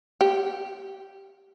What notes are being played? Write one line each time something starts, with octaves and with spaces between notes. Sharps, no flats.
G4